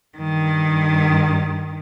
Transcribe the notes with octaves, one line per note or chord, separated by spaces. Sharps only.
G2 D#3